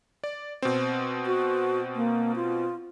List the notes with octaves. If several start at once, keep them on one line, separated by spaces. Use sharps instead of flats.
D5
B2 C4
F#4
A#3
F4